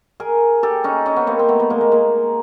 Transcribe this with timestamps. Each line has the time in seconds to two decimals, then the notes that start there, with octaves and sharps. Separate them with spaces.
0.20 G#4 A#4
0.63 G4 A4
0.84 C#4 D#4
1.06 C#4 D#4
1.16 B3 C#4
1.27 A#3 C4
1.39 C4
1.49 A3 B3
1.59 A3 B3
1.70 G#3 A#3
1.81 G#3 A#3
1.92 G#3 A#3